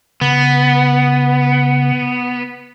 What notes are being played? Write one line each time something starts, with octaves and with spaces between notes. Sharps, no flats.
C#3 B3